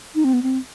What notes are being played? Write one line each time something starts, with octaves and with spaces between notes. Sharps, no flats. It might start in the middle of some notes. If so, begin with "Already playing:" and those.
D#4
C4
B3
C4